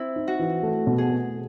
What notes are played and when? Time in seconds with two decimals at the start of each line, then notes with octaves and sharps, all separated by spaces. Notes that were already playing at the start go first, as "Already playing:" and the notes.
Already playing: C4 E4
0.16 D#4
0.28 F#4
0.39 E3
0.63 A3
0.87 B2
0.98 G#4
1.09 A3